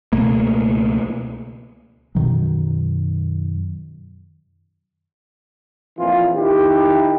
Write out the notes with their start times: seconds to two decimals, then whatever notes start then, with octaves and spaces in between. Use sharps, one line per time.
0.13 C#2 B2 A3 A#3
2.15 F#2 B2 D#3 F#3
5.98 F2 A#2 E3 F4
6.35 D#3 E4 G4